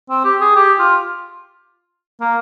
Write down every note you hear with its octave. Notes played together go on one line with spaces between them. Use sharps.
C4
G4
G#4
G4
F4
A#3